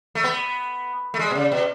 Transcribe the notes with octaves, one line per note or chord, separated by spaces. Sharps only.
A3
B3
A3
G#3
B2
C#3
B2